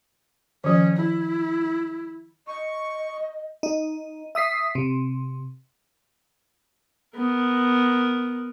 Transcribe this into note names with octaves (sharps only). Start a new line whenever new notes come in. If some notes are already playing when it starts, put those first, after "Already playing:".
D#3 F3 C#4
E4
D#5 C#6
D#4
E5 D#6 B6 C7
C3
B3 A#4